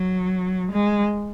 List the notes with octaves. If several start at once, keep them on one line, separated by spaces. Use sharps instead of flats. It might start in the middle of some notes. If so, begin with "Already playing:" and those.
Already playing: F#3
G#3